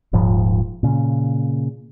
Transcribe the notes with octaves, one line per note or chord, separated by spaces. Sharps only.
D#1 G#2 F3
A#2 C#3